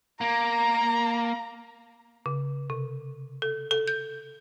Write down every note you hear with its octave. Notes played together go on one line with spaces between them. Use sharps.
A#3 A#5
C#3
C3
A4
A4
G6